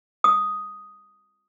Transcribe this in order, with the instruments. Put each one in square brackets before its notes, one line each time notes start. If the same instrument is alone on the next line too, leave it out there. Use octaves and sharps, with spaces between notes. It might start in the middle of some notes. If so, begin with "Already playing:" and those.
[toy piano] D#6